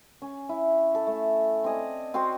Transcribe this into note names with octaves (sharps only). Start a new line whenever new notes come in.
C#4
E4
A4
A3
C4 D5 D#5 G#5
C4 F#4 G5 C6